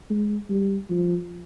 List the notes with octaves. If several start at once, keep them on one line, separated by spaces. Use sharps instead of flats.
G#3
G3
F3